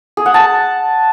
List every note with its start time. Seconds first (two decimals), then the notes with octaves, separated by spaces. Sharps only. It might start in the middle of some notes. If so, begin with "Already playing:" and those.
0.17 G#4
0.26 F#5
0.34 A5